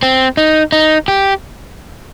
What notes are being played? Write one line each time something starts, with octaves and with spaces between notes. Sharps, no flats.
C4
D#4
D#4
G4